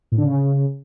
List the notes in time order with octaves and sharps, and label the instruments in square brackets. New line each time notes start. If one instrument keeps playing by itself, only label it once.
[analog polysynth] A2
D3
C#3